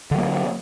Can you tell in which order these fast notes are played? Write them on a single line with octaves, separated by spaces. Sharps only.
D3 F#3 A#3